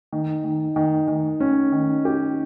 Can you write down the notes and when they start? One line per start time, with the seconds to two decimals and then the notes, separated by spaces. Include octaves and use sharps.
0.12 D#3
0.44 D#3
0.76 D#3
1.08 D#3
1.40 C#4
1.72 D#3
2.05 G4